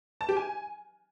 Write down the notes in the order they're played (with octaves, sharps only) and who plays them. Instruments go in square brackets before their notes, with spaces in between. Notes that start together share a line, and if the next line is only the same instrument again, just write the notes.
[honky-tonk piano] A5
G4
G#5